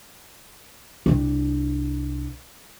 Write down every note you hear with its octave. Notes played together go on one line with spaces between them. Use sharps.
C2 D4